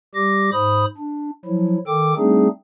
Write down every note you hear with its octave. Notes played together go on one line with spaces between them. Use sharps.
G3 G4 D6 A#6
G#2 C5 B5 D#6
D4
F3 F#3 E4
D#3 A4 G5 D6
G3 A3 C4 D4 D#4 G#4